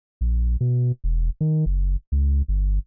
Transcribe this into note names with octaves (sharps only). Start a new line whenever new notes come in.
A#1
B2
E1
D#3
F#1
C#2
G1